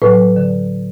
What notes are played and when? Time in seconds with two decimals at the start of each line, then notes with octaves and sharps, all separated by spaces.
0.02 A2 F#3 B4
0.36 D3